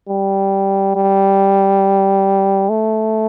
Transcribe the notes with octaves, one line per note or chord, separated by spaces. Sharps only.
G3
G3
A3